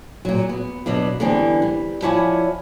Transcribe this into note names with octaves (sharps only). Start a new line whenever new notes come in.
A#2 F#3
B3
B2 F#3 D4
D3 E3 G3 B3 C4 D4
G3
F3 E4 C#5 D5 F#5 G#5